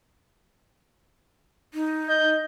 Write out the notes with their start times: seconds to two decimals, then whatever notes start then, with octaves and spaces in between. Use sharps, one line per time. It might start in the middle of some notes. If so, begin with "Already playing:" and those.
1.74 D#4
2.09 D#5 G6